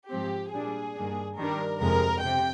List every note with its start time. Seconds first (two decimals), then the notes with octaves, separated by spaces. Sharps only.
0.10 G#2 F3 C4 G4
0.53 A#2 G3 D4 G#4
0.95 G2 D#3 A#3 D4
1.38 G2 D#3 G3 D4 A#4
1.81 F2 C3 F3 G#3 A#4
2.23 C3 G5